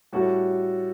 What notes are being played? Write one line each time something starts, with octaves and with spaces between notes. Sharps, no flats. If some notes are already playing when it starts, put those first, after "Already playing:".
A2 G3 C#4 F#4 A4